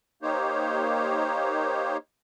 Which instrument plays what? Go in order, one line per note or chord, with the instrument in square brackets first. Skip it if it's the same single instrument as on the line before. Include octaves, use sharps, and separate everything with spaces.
[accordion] A#3 D#4 G4 C5 C#5